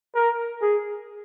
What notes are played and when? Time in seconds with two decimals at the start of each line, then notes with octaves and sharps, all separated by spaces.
0.15 A#4
0.62 G#4